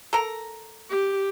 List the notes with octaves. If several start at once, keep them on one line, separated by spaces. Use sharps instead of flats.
A4 A#4 A#5
G4